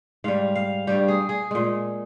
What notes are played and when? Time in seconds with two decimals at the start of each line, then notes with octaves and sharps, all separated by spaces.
0.24 G#2 G3 F5
0.55 F5
0.87 G2 G3 G4
1.08 G#4
1.29 G#4
1.51 A#2 G#3